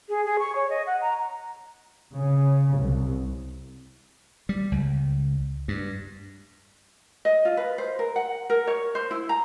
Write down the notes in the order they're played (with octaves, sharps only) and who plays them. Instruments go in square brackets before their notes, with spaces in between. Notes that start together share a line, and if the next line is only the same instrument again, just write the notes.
[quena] G#4
G#4
C#6
C#5
D#5
F#5
A#5
[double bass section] C#3
C2
[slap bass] G3
C#2
G2
[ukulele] D#5
F4
B4
C5
A#4
F#5
A#4
C#5
C5
E4
A#5